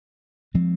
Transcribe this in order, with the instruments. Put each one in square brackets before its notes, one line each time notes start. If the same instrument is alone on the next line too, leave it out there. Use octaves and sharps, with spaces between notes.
[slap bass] F3 G#3 C4